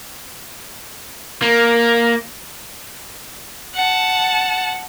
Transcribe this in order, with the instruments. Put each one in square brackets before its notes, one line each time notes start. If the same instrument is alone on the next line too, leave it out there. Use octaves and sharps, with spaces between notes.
[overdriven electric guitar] A#3
[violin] F#5 A5